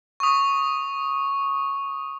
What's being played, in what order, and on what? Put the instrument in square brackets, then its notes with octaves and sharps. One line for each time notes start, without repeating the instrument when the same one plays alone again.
[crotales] C#6 D#6